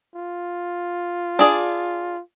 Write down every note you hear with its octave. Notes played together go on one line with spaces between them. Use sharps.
F4
D4 G#4 D5